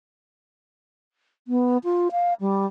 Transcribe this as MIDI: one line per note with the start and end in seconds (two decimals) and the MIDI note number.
1.48 1.77 59
1.84 2.08 65
2.12 2.34 77
2.41 2.66 55